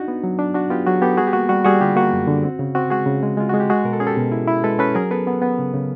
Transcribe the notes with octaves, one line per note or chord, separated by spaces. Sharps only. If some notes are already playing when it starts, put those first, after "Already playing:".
Already playing: D4 D#4 F#4
B3
F#3
D4
D4 F#4
B3 F4 G4
F#3 F#4 G#4
B3 G4 A4
G3 F#4 G#4
G4
A#3 F#4
G3 F#4
G3 F#4 G#4
D3 F4 G4
A#3 F#4
F#2
D3
C4
C#3
C4 F#4
G#3 F#4 G#4
C#3
G#3
G#3 F4
G#3 F#4
G4
G#3 F#4 G#4
B2 A#4
A4
C#4 G#4
G4 A4
B2
E4
E4
G#3 A4 B4
C#4 A4 B4
F#3 G#4 A#4
B3 A4 B4
B3
B3
C#3
C#3